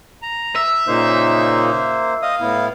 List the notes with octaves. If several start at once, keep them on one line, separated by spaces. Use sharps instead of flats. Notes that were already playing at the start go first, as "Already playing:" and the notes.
A#5
E5
A#2 C#3 A#3 D#4 C5
D#5 F5 D#6
A2 B3 E4